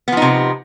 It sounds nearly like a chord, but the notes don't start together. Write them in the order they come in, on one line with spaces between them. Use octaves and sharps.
B3 F3 D#4 C3